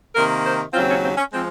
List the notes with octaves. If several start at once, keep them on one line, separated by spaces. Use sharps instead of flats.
C3 D#3 A#3 A#4
C5
D#2 C#3 F#3 C4 F4
C#4
C4
C#4
F3 G#3 C4